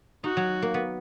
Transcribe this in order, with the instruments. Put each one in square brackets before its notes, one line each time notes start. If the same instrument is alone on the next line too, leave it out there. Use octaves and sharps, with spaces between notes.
[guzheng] D#4 [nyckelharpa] F#4
[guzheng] F#3
A#3
B3